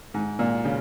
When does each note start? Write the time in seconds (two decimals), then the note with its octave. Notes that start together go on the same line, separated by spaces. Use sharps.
0.14 G#2
0.39 A#2
0.65 C#3